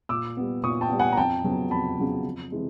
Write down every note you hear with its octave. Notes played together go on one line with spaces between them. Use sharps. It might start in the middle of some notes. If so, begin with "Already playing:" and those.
A#2 D6 E6
G3 B3
A#2 C#6 D#6
G5 A5
G3 B3
F#5 G#5
A#5
F2 G5 A5
C#3 F#3 B3
F2 A5 B5
C#3 F#3 B3
F2
C3 E3 G#3